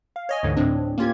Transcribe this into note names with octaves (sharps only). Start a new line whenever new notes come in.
F5
C#5 D#5 G#5
D2 G#2 D3 E3
A2 C4 D4
A#3 C#4 F4 G4 G#6